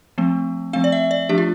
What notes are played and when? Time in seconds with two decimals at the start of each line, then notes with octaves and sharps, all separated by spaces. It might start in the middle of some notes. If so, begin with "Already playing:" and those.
0.18 F3 A3 C4
0.73 F3 A3 C4 F5
0.84 D5
0.92 E5
1.11 D5
1.29 F3 A3 D4 G4
1.38 F4